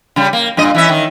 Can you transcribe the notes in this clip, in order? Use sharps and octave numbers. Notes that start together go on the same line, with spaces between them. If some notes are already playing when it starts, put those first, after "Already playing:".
C#3 G3
A#3
G2 A#2 D#5
E3 C#4 E5
D#3